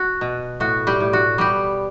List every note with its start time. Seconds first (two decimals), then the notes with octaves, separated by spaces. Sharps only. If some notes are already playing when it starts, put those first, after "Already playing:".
Already playing: F#4
0.21 B2
0.60 A2 F#4
0.87 G3 G4
1.00 A2
1.13 F#4
1.38 G3 B3 G4